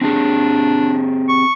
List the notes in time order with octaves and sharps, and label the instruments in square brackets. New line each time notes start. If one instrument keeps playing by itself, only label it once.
[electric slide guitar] C4 G4 G#4 [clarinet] D4
[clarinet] C#6